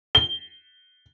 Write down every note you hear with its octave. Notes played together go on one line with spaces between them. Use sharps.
G7